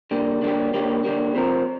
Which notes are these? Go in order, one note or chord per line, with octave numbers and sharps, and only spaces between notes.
D3 G3 A#3 G4
D3 G3 A#3 G4
D3 G3 A#3 G4
D3 G3 A#3 G4
C3 F3 C4 A#4